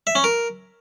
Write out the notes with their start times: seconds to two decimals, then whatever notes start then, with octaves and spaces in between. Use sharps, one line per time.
0.07 E5
0.15 C#4
0.24 A#4